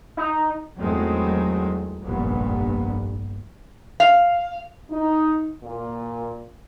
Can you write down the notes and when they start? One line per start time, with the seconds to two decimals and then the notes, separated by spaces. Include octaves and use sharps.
0.17 D#4
0.79 E2 D#3 F#3 G#3 A3 C4
2.03 F1 A#1 G2 A#2 B3
4.00 F5
4.91 D#4
5.63 A#2